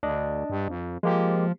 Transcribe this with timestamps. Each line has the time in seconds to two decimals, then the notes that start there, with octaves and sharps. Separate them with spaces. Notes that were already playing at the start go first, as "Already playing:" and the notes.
0.03 D2 D4 D#5
0.50 G2
0.68 F2
1.03 F3 G#3 A#3 G4